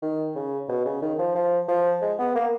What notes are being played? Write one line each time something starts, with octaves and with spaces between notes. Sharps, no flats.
D#3
C#3
B2
C#3
D#3
F3
F3
F3
G#3
B3
A#3